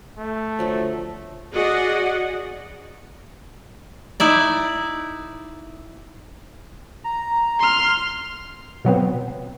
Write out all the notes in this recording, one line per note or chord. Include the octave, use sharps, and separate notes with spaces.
A3
D3 F3 F#3
F#4 G#4 D5 D#5 F#5
D#4 E4 D5
A#5
C6 F6
B2 F#3 B3 C4